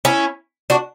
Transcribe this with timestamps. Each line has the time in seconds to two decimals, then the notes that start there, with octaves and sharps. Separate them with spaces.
0.05 C#4 E4
0.70 D4 F#4